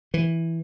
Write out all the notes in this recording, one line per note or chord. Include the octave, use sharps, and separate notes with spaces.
E3